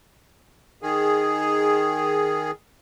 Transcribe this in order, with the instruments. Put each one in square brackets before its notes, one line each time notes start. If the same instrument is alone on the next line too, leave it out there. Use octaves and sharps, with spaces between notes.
[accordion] D#3 G#4